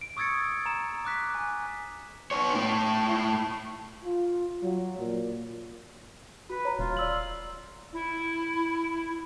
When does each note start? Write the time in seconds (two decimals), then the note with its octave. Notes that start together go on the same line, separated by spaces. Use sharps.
0.01 D7
0.17 C#6 D#6 E6 G#6 A6 C#7
0.66 A#5 E7
1.05 D6 F#6 B6
1.35 G#5
2.31 B3 C#5
2.55 A2 E4
4.05 F4
4.63 F#3
4.99 A#2
6.50 F#4 B4
6.65 C#5 A#5
6.79 D#1 F4
6.97 D5 E6 F#7
7.93 E4